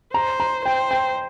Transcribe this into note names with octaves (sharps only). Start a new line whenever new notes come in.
C5 A#5
A#5
C5 G5
G5